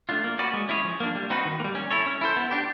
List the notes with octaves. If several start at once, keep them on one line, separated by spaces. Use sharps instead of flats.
A3 D4 F4
A#3
C#4 F#4 B4 D5
G#3
C#4 E4 G#4 C#5
F3
A#3 D4
G3
C4 D#4 F#4 B4
D#3
A#3
G3
C#4
E4 A4 C#5
C#4
E4 A4 C5
B3
D4 G4